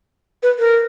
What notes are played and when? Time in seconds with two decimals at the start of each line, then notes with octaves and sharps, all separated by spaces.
0.43 B4
0.59 A#4